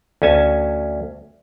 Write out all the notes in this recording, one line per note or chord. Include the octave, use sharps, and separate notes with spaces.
D2 C#4 G#5 A5